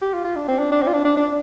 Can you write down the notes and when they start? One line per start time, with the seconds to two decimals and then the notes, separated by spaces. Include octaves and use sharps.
0.02 G4
0.13 F4
0.24 F4
0.36 D4
0.48 C4
0.59 D4
0.71 D4
0.82 C4
0.88 F4
0.93 D4
1.05 D4
1.17 D4